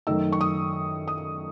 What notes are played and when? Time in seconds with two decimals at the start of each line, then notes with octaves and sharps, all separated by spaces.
0.07 F#2 D#3 A3 D#4 E6
0.32 C#6
0.41 D#6
1.08 D#6